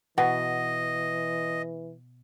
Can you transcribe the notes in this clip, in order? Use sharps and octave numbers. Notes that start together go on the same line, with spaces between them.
B2 E3 D#5 F#5